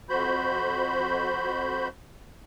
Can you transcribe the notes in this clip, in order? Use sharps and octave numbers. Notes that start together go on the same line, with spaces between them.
F2 F#4 C5 B5 G6